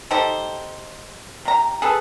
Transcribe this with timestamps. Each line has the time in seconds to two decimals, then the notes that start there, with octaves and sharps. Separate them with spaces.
0.11 D#4 G4 A4 C5
1.45 C3 A#5
1.82 G#4 A4 B4